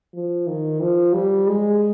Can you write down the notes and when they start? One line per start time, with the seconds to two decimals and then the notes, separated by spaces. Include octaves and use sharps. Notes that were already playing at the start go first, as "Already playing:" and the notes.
0.13 F3
0.47 D#3
0.80 F3
1.13 G3
1.47 G#3